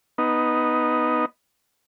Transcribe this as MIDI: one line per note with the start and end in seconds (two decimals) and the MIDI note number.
0.18 1.25 59
0.18 1.25 63